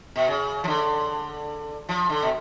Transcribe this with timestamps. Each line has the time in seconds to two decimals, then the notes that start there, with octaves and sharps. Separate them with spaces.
0.16 B2
0.28 C#3
0.64 F3
0.68 D3
1.89 F3
2.09 D3
2.22 B2